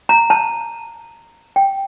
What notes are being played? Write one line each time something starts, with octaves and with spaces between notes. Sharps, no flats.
A#5
A5
G5